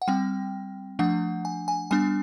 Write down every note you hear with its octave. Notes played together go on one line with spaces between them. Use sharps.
F#5
G3 C4 G5
F3 A3 D4 F#5
G#5
G#5
G3 B3 D4 G#5